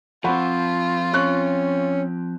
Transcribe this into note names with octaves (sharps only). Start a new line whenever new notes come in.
F3 C4 F4 F#5 B5 C#6
C#4 C#6 F#6